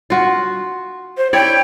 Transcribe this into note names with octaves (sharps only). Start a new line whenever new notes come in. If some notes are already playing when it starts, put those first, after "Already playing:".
F4 F#4
C5
E4 C#5 D5 G5